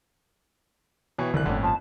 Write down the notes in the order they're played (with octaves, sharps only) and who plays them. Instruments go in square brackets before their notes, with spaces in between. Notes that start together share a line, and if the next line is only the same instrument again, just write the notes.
[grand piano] B2 E3 [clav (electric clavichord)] C#5 G5
[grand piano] F1 F#6 [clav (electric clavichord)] C2 [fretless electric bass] D3 D#3
[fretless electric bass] G1 A2 [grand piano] F2 A#3 C#4 [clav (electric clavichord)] D3
[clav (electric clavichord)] F3 [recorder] A5